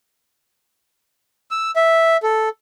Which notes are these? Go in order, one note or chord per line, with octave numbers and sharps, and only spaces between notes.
E6
E5
A4